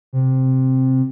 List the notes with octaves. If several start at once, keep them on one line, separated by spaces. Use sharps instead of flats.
C3